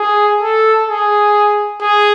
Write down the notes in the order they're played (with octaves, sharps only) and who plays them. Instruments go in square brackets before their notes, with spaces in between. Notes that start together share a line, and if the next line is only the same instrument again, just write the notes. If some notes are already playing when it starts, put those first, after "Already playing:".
Already playing: [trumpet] G#4
A4
G#4
G#4